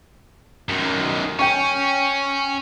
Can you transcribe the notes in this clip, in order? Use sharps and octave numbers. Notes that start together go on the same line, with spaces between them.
F#2 D#3
C#4 G5 C#6